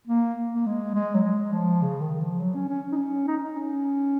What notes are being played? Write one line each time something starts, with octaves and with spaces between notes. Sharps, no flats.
A#3
A#3
G#3
G#3
F#3
G#3
F3
C#3
D#3
F3
F#3
C#4
C#4
D#4
C#4
D#4
D#4
C#4